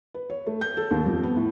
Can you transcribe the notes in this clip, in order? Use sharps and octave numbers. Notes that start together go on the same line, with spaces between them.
B4
C#5
A3
G6
A4
D#2
F2
B3
A2